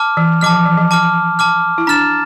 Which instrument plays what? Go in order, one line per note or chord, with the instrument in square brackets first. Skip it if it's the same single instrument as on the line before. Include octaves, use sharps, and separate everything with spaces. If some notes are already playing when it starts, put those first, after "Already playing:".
Already playing: [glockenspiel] A5 D6 F6
[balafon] E3
[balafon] F3 [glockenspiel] A5 D6 F6
[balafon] F3
E3
F3
[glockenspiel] A5 D6 F6
A5 D6 F6
[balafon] E4
[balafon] D4 [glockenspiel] A#5 F6 A6 E7